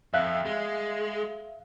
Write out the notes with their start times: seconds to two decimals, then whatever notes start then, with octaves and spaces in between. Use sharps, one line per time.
0.14 F2 E5 F5 F#6
0.45 G#3